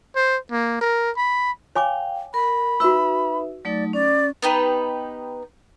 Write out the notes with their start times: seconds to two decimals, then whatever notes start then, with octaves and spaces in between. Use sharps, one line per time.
0.16 C5
0.51 A#3
0.81 A#4
1.17 B5
1.76 C#5 F5 G5 G#5 D6
2.34 A#4 B5
2.80 D#4 F#4 B4 E5 E6
3.65 F#3 A3 D#4 D5
3.93 C#4 D5
4.42 B3 D#4 G4 B4